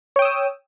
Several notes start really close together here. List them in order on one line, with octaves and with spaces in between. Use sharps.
C#5 G5 D#6 E6